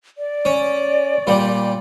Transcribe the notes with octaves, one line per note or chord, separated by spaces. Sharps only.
D5
C#4
A#2 G3